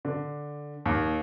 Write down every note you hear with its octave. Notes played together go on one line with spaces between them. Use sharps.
D3
D#2